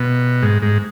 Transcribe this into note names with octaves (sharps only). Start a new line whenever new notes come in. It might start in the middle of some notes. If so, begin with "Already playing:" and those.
Already playing: B2
G#2
G#2